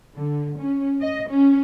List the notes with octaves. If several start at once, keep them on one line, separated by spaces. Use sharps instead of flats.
D3
C#4
D#5
C#4